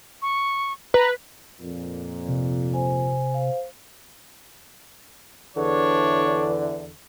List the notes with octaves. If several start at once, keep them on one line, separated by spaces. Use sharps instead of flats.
C#6
B4 A#5
F2 A#2
C3
C5 G#5
C5 F5
E2 D3 E3 D4 C#5